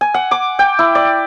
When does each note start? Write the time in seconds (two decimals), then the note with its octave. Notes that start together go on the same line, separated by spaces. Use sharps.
0.01 G#5
0.14 F#5
0.31 D6
0.59 G5
0.79 E4
0.95 D5